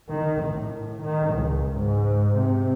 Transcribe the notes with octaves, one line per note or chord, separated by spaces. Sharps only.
D#3
A2
D#3
C#2
G#2
C3